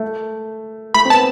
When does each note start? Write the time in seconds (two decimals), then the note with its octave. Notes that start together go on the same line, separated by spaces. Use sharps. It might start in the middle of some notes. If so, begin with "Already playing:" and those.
Already playing: A3
0.94 A3 B5
1.05 C4
1.10 B3 A5